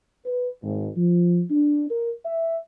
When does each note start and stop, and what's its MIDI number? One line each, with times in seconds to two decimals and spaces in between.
0.26 0.50 71
0.63 0.89 32
0.97 1.42 53
1.51 1.87 62
1.90 2.13 70
2.26 2.57 76